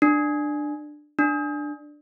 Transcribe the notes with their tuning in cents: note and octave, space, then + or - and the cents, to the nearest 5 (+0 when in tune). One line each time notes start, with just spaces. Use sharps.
D4 +15
D4 +10